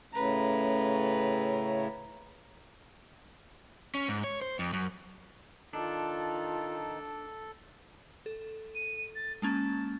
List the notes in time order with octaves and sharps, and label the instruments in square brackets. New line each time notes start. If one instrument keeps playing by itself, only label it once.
[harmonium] A2 C#3 [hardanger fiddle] B4 A#5
[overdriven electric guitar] C#4
G#2
C#5
C5
F2
F#2
[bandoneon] D#3 D#4 [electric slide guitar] D4 [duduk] F4 [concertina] A4
[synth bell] A4
[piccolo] D#7
A6
[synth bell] G#3 A#3 C#4 [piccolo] A5